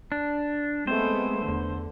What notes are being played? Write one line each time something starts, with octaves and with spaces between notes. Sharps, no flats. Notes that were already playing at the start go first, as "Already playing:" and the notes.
D4
G#3 A3 B3 C4 C5
E2 D3